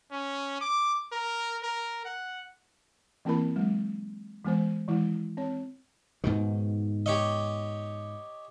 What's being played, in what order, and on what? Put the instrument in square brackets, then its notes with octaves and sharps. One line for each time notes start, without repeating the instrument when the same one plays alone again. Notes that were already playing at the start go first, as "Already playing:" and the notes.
[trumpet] C#4
D6
A#4
A#4
F#5
[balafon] E3 A#3 C4 E4 A#4 B5
F#3 G#3
E3 G#3 B3 C5
D#3 E3 G#3 E4
C4 C#5
[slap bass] G#2 B2 D#3
[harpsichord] G4 C#5 D#5